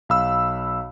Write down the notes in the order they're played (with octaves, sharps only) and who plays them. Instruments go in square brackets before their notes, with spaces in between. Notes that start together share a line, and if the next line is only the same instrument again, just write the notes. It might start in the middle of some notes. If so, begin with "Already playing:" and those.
[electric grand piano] B1 F5 B5 E6